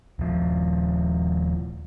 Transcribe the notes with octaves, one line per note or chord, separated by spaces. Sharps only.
D#1 F3